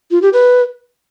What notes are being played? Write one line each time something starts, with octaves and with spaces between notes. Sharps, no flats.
F4
G4
B4